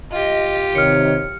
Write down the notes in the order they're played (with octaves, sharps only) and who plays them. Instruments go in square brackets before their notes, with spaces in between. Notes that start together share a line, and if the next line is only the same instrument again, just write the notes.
[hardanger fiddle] F4 G4 [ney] D#5
[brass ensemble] C3 D#3 [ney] C#5 [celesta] F6 C#7